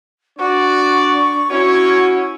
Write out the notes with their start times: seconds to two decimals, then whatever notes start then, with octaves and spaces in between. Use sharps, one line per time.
0.39 D4 F#4 D5 C#6
1.50 C#4 E4 F#4 C#5